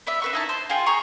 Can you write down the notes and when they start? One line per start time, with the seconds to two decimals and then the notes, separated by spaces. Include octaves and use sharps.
0.07 B3 D5 E5
0.22 C4 B4 C#6
0.33 D#4 E4 A5
0.49 C5
0.70 F4 G#4 G5
0.86 G#4 A#5 C#6